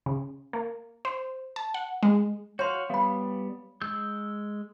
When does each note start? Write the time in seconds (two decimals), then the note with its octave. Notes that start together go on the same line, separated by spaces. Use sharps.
0.06 C#3
0.53 A#3
1.05 C5
1.56 A5
1.74 F#5
2.03 G#3
2.59 F#4 C#5 F5 C6
2.90 G3 B3 F5 B5
3.82 G#3 E6 G6